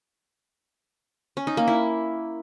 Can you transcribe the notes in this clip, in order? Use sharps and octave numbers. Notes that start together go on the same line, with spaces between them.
C#4
D#4
A#3
E4